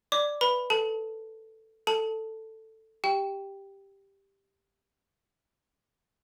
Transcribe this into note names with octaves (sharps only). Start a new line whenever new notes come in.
D5 D6
B4 B5
A4 A5
A4 A5
G4 G5